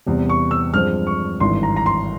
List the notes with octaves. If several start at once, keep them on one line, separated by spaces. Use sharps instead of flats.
E2 C3 G3
C#6
E6
G2 F3 G#3 C4 F6
C#6
G#1 G2 E3 C6
A#5
A#5
C6